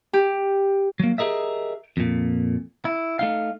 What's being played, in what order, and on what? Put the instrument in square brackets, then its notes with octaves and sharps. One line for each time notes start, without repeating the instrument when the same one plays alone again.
[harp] G4
[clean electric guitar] F#3 A#3
G4 G#4 A#4 D#5 E5
F2 A#2
E4
A3 D#4 F5